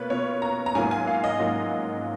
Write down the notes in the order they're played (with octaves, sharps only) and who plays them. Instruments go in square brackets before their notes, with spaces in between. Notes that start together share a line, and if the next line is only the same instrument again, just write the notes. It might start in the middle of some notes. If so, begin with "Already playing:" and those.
Already playing: [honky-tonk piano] B2 A#3 F4 B4 C#5
B2 A#3 F4 C#5
A#5
A#5
G#2 F#3 A#3 F4 G#5
G#5
F5
D#5
G#2 F#3 A#3 F4